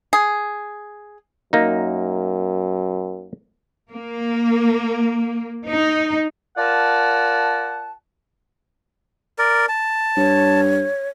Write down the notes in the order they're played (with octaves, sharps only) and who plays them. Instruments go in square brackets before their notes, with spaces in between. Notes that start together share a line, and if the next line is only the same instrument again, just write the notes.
[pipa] G#4
[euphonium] F#2 [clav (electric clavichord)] A#3 D#4
[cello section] A#3
D#4
[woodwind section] F4 A#4 D5 F#5 A5
[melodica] A#4 D5
A5
[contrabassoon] G2 [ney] C#5